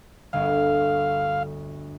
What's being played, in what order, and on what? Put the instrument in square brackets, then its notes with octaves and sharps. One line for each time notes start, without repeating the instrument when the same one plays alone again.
[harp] G1 D2 [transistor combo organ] F5